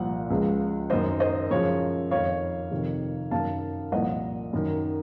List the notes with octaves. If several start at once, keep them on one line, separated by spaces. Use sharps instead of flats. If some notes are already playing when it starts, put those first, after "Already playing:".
Already playing: C2 A#2 F3 F#5
C#2 C#3 F3
F#2 D#3 C5 D#5
C5 D#5
F#2 C#3 F3 C#5
F2 D#3 C#5 F5
F2 C3 D#3
F#2 D#3 F5 A5
C2 A#2 F3 D#5 F#5
F#2 D#3